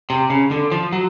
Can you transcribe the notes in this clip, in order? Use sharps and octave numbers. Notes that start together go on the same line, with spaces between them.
C3
C#3
D3
F3
F#3